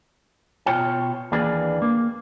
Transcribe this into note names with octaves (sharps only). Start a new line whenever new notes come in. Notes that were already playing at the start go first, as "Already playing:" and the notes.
B2 F4 C#5 G5
D#2 E3 A#3 D4 G#4 B4
A#3